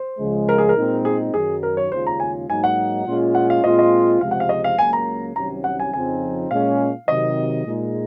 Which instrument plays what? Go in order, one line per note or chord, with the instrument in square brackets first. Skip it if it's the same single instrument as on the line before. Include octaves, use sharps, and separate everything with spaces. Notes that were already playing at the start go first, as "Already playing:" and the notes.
Already playing: [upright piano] C5
[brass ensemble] C#2 C#3 F3 G#3
[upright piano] A#4
G#4
A#4
[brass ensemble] A#2 G#3 C4 D#4
[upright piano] G#4
[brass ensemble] F#2 D#3 F#3 [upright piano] G#4
[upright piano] A#4
C#5
[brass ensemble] D#2 C#3 G#3 C#4 F4 [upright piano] C5
[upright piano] A#5
G#5
[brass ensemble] G#2 F#3 A#3 D#4 [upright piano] G#5
[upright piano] F#5
[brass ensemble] A#2 G#3 C#4 F4
[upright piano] F#5
F5
[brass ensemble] A#2 G#3 C4 F4 [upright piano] D#5
[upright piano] D#5
[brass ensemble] C#2 C3 F3 G#3 [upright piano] F5
[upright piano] F#5
F5
D#5
F5
[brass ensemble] C#2 C#3 F#3 A#3 [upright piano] G#5
[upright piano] A#5
[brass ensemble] C2 C3 D#3 F#3 C#4 [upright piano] A#5
[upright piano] F#5
G#5
[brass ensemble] F2 C#3 F3 C4 D#4 [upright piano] G#5
[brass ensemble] A#2 G#3 C#4 [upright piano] F5
[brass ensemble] C3 D#3 F#3 [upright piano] D#5
[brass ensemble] A#2 G#3 D#4